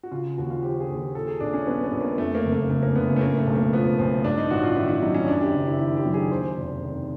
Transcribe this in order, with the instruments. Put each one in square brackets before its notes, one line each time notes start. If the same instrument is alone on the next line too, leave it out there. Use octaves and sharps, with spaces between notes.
[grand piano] F#4
C#3 F4
D#2 F#4
F4
F3 G4
G#4
D#2
G#4
A#2 A4
G#4
A#1 D4
C#4
G3 B3
B3
A#1
A#3
F2 A3
A#3
F#1
A3
C#3 A3
A#3
F#1 B3
C#4
A3
A2 A#3
A3
B1
A#3
F3 B3
B1 C4
G2 D4
D#4
A1 F#4
F4
D#3 E4
E4
F#3 D#4
C#4
F#2 D4
G4
F#1
E4
D#3 E4
G4
F#3
G#4
D#2 C5
F1
D#3